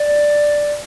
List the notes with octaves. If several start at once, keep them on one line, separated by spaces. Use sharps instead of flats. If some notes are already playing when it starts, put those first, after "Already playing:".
Already playing: D5